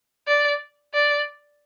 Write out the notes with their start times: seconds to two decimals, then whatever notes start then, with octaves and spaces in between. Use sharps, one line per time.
0.27 D5
0.94 D5